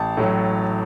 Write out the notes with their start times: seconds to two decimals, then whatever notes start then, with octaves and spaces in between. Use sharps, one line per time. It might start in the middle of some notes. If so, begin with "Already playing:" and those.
Already playing: A1 A5
0.17 A2 F#3